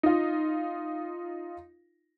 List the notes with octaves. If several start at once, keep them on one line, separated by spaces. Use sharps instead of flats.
D#4 F4